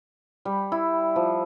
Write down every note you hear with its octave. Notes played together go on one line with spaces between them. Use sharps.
G3
E4
F3